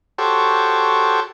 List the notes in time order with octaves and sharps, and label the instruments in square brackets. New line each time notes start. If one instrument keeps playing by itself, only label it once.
[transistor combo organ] F#4 G4 A4 C5 C#5